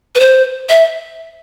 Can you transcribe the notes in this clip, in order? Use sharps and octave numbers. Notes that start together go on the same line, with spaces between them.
B4
C5
E5